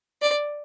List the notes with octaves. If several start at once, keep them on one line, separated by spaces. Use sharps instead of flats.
D5